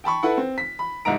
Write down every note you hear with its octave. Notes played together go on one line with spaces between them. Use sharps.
G5 A5 B5 C#6
E4 A4 B4 F#5
C4
B6
B5
C2 G#2 D#5 A#5 D7